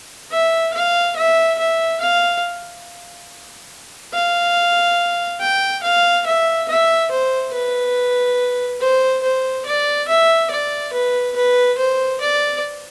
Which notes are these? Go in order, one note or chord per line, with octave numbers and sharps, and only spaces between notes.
E5
F5
E5
E5
F5
F5
G5
F5
E5
E5
C5
B4
C5
C5
D5
E5
D5
B4
B4
C5
D5